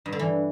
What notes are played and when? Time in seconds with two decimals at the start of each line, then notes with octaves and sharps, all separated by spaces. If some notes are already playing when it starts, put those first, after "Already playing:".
0.06 G2
0.12 D3
0.19 E3